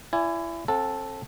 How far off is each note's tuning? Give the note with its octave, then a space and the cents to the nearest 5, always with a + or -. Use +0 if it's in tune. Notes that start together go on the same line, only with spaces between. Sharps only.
E4 +25 D5 -25 G#5 +0
C4 +35 A4 +0 F#5 -45